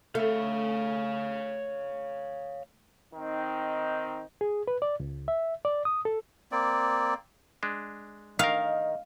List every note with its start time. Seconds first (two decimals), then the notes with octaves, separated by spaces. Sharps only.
0.15 A3 C#5 F5
3.14 D#3 C4 D#4
4.41 G#4
4.68 B4
4.82 D5
5.00 C#2
5.28 E5
5.65 D5
5.85 D#6
6.05 A4
6.52 A#3 C4 D5
7.63 G#3 D4
8.39 D#3 A#4 D#5 F5